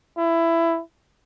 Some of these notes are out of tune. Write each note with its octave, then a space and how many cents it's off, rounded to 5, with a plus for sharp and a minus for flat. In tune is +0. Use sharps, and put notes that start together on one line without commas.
E4 +15